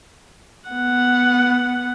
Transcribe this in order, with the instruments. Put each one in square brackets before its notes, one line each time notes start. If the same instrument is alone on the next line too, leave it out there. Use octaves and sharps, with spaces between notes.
[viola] B3 F#5